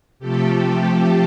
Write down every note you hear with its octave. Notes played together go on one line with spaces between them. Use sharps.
C3 F3 A3 G4 A4